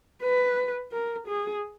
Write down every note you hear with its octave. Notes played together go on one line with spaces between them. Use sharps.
B4
A#4
G#4